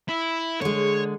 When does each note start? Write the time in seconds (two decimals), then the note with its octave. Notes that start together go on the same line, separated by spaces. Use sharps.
0.08 E4
0.62 D3 G#3 C#5